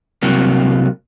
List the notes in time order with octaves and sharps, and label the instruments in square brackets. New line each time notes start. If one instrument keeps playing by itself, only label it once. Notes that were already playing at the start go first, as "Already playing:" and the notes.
[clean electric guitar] C2 C3 F#3 A#3